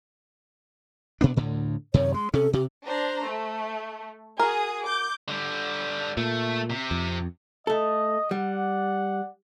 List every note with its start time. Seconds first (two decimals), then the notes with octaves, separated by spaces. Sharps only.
1.21 B2 B3 D4
1.36 D2 A2 D3
1.94 F#2 C3 D#3 C#5
2.14 G#3 C6
2.34 C3 C#4 A4
2.53 C3 G4
2.84 D4 C5 A#5
3.23 A3
4.40 F#4 G#4 A#4 D#6
4.83 D6 G6
5.28 D3 G3
6.17 A#2 A3
6.70 C3
6.91 F2
7.67 A3 A4 D#5
8.31 G3 D5 F#5